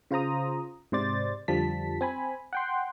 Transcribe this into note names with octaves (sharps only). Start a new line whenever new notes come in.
C#3 F4 C5 A#5 D#6
G#2 C3 C5 D5 A6
F2 D3 F3 G3 A5 B6
C4 G#5 B5
F#5 G5 C6